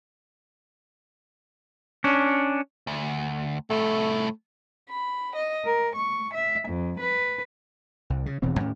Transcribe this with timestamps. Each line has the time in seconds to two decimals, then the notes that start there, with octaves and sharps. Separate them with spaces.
2.04 C#4 D4
2.87 D2
3.70 C2 A2 A3
4.89 B5
5.34 D#5
5.66 A#4
5.97 C#6
6.36 E5
6.69 F2
7.01 B4
8.10 C2
8.26 C#3
8.42 D#1 B2 E3 C4
8.60 D#2 A2 C#4